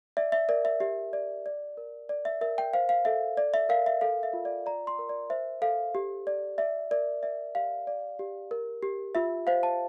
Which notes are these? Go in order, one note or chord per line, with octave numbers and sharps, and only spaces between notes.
D5 E5
E5
A#4 D5
E5
G4 E5
D5
D5
A#4
D5
E5
A#4 E5
G5
C5 F5
F5
A4 E5
D5
E5
A#4 F5
E5
A4 F5
E5
F4
D5
D5 A#5
C6
A#4
D5
C5 E5
A4 F5
G4
D5
D5 E5
A#4 D5
D5 E5
G4 F5
D5
G4
A#4
G4
F4 E5
C5 F5
A5